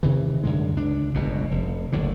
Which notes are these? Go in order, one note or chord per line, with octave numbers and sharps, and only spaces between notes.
C3 D#3 E3
F#2 D3 G#3
C#2 D4
G1 C#2 F#2 B2
F1
F#1 D2 A2 D3